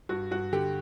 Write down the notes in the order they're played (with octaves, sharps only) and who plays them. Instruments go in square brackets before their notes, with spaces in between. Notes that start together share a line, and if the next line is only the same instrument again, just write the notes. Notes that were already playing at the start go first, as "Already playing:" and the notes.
[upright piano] G2 F#4
G2 F#4
D3 G4